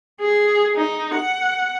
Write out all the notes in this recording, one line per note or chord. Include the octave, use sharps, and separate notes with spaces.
G#4
D#4
F#5